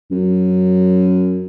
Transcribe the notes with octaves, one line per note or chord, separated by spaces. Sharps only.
F#2